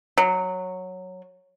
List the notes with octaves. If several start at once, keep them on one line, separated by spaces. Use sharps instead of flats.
F#3